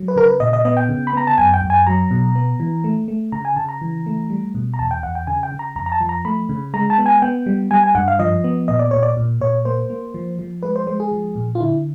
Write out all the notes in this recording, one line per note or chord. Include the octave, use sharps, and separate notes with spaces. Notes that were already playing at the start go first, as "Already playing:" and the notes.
Already playing: F#3
B4
C#3 A#4
B4
A#2 D#5
D#5
B3 D#5
G5
C#3
B5
B3 A#5
A5
F#2 G#5
G5
F#2
G#5
F#3 A#5
B2
B3
E3
A3
A3
C#3 A#5
G#5
C#3 A5
A#5
E3
A3
G3
B2
A#5
E2 A5
G5
E2 F#5
G5
C#3 G#5
G5
C#3
A#5
F2 A#5
A#5
A5
F3
A#5
A3 B5
C#3
G#3 A#5
A5
B3
G#5
B3 G5
G3
G3 G#5
G#5
G2 F#5
F5
F3 D#5
B3
A#2 D#5
D5
A#2 C#5
D5
A#2
A#2 C#5
A#3 C5
A#3
F3
F3
G#3 B4
C5
G#3 C5
G#4
F3
A#2
F4
D3 E4